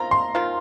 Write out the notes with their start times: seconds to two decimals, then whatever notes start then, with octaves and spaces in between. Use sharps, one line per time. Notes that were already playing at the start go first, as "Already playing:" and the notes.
Already playing: D#3 C4 F4 A#5
0.11 C6
0.35 D#3 C4 F4